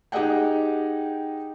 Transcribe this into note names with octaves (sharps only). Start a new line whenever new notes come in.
D#4 G4 G#4 D#5 F#5 G5